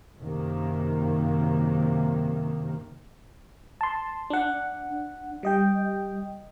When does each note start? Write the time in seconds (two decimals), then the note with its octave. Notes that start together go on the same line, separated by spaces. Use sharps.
0.18 F#2 C3 D#3 A#3
3.81 A5 C6
4.30 D4 F#5
5.43 G3 D#5 G5